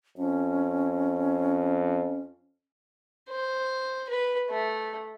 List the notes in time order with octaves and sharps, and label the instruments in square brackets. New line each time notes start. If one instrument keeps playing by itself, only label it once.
[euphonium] F2 [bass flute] C#4
[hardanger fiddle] C5
B4
A3